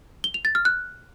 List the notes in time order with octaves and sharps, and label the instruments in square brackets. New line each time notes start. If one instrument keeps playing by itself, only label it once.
[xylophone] G7
F7
A6
F6
F#6